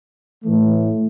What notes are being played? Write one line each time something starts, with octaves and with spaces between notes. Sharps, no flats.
A2 E3 A3